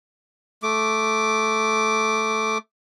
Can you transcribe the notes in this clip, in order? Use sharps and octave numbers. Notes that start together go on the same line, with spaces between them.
A3 D6